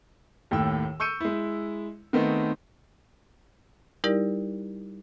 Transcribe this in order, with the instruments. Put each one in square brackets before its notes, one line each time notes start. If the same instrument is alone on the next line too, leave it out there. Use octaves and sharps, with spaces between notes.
[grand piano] D#2 A2 G5 E6
C#6 E6 G6 C#7 D#7
G#3 E4
D#3 A3 B3 C4 D#4
[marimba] G3 D#4 E4 G4 A#4 D5